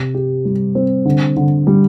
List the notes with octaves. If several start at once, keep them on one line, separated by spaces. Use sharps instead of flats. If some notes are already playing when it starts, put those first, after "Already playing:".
Already playing: C3
G4
G3
C4
D3
D3
G3